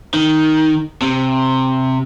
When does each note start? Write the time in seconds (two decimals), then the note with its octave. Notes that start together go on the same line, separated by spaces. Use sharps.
0.14 D#3
1.02 C3